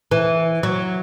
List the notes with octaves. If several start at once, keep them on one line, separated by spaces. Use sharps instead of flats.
E3
F#3